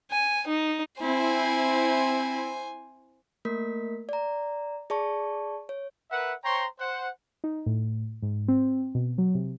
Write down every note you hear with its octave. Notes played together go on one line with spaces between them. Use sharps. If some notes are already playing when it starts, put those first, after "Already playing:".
G#5
D#4
C4 E4 C5 G#5
A3 A#3 A#4 B6
D5 A#5
G#4 D5 A5 C#6
C#5
A#4 B4 E5 F#5
C5 C#5 G5 A#5 C6 C#6
C5 F#5
D#4
A2
G#2
C4
B2
F#3
C3